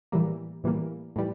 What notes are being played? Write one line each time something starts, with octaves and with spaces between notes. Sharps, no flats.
A2 E3 G3 A#3
A2 E3 G3 A#3
A2 E3 G3